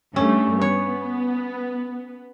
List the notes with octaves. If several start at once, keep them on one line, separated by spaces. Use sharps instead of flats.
G2 A3 C#4
B3 C#5